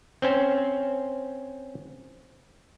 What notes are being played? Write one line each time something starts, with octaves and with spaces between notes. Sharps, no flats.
C4 C#4 C5